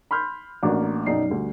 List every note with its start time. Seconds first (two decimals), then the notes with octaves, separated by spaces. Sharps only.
0.11 B5 C6 F6 G6
0.63 A1 A#3 D4 F#4 D6
1.06 B1 F#2 D#4 D5 C7
1.29 D2 G3